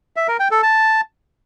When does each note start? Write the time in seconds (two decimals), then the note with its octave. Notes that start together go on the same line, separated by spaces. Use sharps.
0.16 E5
0.28 A#4
0.40 G5
0.51 A4
0.63 A5